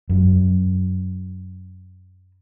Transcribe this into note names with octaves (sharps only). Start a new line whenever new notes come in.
F#2 F#3